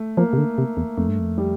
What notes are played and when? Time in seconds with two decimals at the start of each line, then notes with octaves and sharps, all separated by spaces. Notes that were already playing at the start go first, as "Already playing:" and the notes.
Already playing: A3
0.17 F3 A#3
0.33 C3
0.38 D3
0.58 C3
0.77 E2
0.97 F2 A3
1.09 G2
1.20 F2
1.38 G3